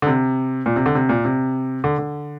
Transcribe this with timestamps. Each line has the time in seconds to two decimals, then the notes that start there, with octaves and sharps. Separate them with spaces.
0.02 D3
0.07 C3
0.66 A#2
0.76 C3
0.86 D3
0.95 C3
1.09 A#2
1.25 C3
1.84 D3
1.98 D3